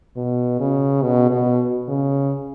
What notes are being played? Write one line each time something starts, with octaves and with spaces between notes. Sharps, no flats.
B2
C#3
B2
B2
C#3